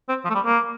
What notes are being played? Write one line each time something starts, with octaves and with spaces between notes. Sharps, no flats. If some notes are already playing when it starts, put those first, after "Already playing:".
C4
F3
A3
G3
A#3